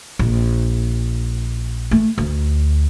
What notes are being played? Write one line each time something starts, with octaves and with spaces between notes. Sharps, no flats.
A#1
A3
D2